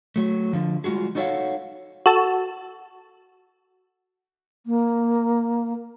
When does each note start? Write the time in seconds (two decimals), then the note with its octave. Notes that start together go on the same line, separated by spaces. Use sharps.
0.16 F#3 A3
0.53 D3 F3
0.84 G3 G#3 F4 F#4 G#4
1.15 D#4 F#4 A4 C#5 F5 F#5
2.06 F#4 A4 A5
4.66 A#3